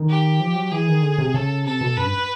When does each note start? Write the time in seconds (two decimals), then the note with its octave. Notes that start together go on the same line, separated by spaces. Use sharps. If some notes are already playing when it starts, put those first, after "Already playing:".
Already playing: D#3
0.09 G4
0.40 F3
0.55 F#3
0.71 E3 G#4
0.88 D#3
1.02 D3
1.18 C3
1.34 C#3 A4
1.66 C3 A4
1.81 B2
1.97 F#2 B4
2.05 G2